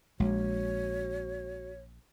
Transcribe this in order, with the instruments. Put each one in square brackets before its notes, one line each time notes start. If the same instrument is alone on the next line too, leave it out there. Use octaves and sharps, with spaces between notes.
[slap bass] A#1 [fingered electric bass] G#3 [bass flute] F#4 [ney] C#5